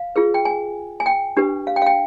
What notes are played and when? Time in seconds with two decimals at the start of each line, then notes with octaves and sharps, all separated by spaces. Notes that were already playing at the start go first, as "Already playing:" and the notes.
Already playing: F5
0.16 F4 G#4 B4
0.34 G5
0.45 G#5
1.00 G#5
1.06 G5
1.37 D4 G4 B4
1.67 F5
1.76 G5
1.82 F5
1.86 G5